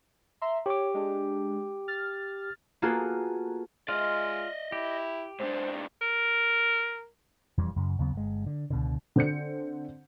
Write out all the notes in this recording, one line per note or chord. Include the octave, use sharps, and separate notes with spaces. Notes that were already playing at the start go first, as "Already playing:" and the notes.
E5 A#5 C6
G4 C#5 D6
G#3 D4
F6 A6
A#3 B3 F4 F#4 G#4 A4
G#3 F4 D5 D#5
E4 G4
G#2 D4 C5
A#4
E1 F2 E3 G3
F#2 C#3
D#2 C#3 F#3 B3
G1 G#3
D3
C#2 B2 D3
D3 C4 G6 C#7